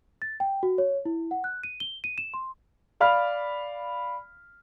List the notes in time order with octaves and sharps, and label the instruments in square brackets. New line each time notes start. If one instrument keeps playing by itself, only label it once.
[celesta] A6
G5
F#4
C#5
E4
F#5
F#6
D#7
G7
D#7
E7
C6
[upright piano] D5 F5 B5 F6